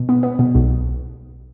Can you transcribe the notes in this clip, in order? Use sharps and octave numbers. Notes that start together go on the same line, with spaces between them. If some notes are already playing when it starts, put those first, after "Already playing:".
Already playing: B2
B3
B3
B2
B1